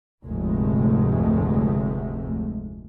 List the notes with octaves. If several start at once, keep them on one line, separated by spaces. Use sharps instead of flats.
F1 D2 G#2 C3 G#3 A3